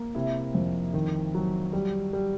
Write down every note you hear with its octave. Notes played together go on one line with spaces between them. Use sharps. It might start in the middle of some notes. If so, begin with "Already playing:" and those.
Already playing: A#3
C3 E4
F2
D#3
F#3
G3
G3